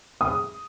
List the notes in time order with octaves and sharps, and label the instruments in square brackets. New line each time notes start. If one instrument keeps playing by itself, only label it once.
[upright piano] D#6